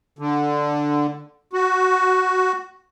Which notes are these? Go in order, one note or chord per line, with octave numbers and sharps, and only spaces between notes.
D3
F#4